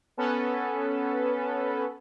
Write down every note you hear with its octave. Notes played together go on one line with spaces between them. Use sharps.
B3 C#4 A4 B4